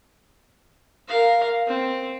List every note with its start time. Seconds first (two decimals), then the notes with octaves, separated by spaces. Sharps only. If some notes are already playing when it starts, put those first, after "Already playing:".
1.08 A#4 F5
1.67 C4